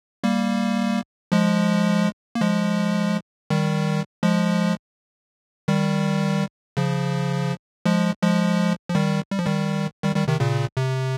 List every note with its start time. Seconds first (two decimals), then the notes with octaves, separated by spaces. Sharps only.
0.24 G3 A#3
1.32 F3 G#3
2.35 A#3
2.41 F3 G#3
3.50 D#3 G3
4.23 F3 G#3
5.68 D#3 G3
6.77 C#3 F3
7.86 F3 G#3
8.22 F3 G#3
8.89 F3
8.95 D#3 G3
9.31 G3
9.39 F3
9.46 D#3 G3
10.03 D#3 G3
10.16 D#3 G3
10.28 C3 D#3
10.40 A#2 C#3
10.77 C3